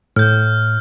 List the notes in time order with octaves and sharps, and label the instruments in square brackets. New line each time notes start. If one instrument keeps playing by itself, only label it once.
[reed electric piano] A2 [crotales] F6 G6